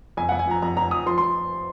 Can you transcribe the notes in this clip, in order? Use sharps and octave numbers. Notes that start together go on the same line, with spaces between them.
F2 G#5
F2 F#5
G#5
F3 A#5
F2 A#5
F2 A#5
F3 D#6
F3 C6
F3 C6